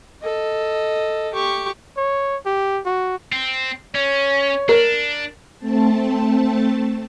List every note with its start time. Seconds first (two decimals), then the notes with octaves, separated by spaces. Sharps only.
0.22 A4 D#5
1.33 G4 C#6
1.97 C#5
2.46 G4
2.85 F#4
3.32 C4
3.95 C#4 C#5
4.69 D4 A#4
5.58 A3 C4 A5